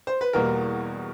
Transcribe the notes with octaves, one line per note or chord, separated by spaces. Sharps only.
C5
B4
E2 B2 G3 A#3 A#4